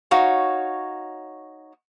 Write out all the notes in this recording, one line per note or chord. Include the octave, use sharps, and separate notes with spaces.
D#4 F#4 C#5 F5